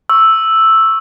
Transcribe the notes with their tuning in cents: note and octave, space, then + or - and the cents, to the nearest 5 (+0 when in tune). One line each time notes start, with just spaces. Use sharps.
C#6 -5 E6 +0